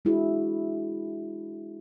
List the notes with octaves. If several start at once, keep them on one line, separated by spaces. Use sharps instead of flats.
G#3 D4 E4 F#4 G#4